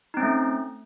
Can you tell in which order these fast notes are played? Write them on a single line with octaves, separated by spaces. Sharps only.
D#4 C4 C#4 A3